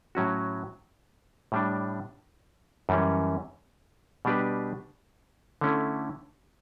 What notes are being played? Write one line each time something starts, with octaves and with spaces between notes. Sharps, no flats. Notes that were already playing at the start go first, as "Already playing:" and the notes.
A2 F#3 C#4 F#4
A2 G3 D4
F#2 E3 G3 C#4
B2 G3 D4 G4 B4
D3 A3 C#4 E4